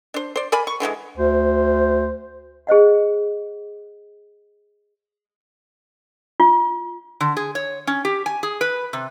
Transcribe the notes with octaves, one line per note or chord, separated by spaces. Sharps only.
D4 C5
C5 D5
A#4 D5 G#5 B5
C#6
D3 E3 F#3 G#3
D2 C5
G#4 C5 D#5 F#5
F4
D3
G#4
C#5
C#4
G4
G#5
G#4
B4
C3